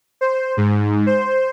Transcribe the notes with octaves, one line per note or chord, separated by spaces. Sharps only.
C5
G#2
C5